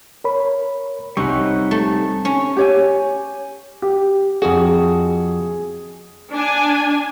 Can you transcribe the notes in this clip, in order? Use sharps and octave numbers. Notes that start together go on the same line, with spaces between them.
A#4 C#5 B5
C2 C3 G3 C#4 D#4 F#5 C#6
A3
C#4
G4 C#5 G#5
G4
F2 F#4 G#4
D4 G#5